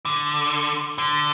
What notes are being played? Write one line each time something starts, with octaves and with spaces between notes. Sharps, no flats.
D3
D3